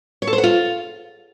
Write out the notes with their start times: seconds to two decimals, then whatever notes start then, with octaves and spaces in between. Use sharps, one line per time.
0.22 C#5
0.27 A4
0.33 C5
0.38 F#5
0.44 F4